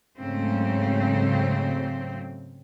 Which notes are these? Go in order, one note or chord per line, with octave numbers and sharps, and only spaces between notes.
G#2 C#3 F#3 A3 C4